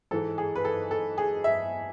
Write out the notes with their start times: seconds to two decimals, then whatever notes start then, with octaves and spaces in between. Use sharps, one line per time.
0.11 G#2 E3 A4
0.38 G#4
0.56 B4
0.65 A4
0.91 A4
1.18 G#4
1.44 E5